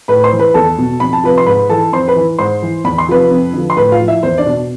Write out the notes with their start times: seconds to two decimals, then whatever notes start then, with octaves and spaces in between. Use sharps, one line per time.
0.08 A2 B4 B5
0.24 C5 C6
0.32 E3
0.39 B4 B5
0.54 E2 A4 A5
0.78 B2
1.00 F2 B5
1.13 A5
1.24 C3 F3 B4 B5
1.38 C6
1.46 G#2 B4 B5
1.69 E3 A4 A5
1.92 F2 C5 C6
2.08 B4 B5
2.16 E3
2.38 G#2 C5 C6
2.62 E3
2.84 E2 B5
2.98 C6
3.08 C3 F3 B4 B5
3.31 F2
3.53 D3 F3
3.70 C6
3.77 A2 B4 B5
3.92 F4 F5
4.00 F3
4.08 E4 E5
4.23 E2 C5
4.38 D4 D5
4.46 B2